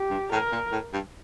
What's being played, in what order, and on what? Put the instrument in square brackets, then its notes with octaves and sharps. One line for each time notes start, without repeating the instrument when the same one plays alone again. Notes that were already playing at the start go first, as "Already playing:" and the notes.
Already playing: [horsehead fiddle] G4
[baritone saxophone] G2
[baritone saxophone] A2 [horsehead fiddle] A#4
[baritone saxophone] A#2
A2
G2